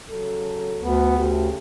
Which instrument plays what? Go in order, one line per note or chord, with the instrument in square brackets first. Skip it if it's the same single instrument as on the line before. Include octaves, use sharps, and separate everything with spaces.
[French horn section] C#3 F#3 A4
[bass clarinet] D2 [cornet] B3
[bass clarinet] D2 [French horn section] C#3 A3 G4